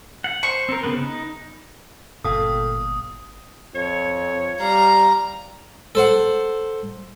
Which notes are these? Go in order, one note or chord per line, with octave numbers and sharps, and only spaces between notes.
F#5
C5 C#6
C4 A#4
C#3 B3 B4
D#4
G1 A#2 A4 F5 G5 D#6
F2 C#5
G3 F5 A#5
A4 C5 F#5